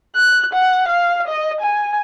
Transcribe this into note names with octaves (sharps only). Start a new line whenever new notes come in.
F#6
F#5
F5
D#5
G#5